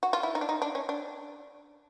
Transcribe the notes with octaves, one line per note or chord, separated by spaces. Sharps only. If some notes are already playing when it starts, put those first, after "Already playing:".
F#4
F4
E4
D#4
D4
D#4
D4
C#4
D4